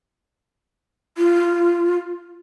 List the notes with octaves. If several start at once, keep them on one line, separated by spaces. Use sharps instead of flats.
F4